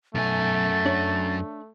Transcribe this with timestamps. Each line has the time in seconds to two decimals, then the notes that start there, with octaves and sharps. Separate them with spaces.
0.15 B1 F#2 A3 G#5 A6
0.86 D4 A4 C#5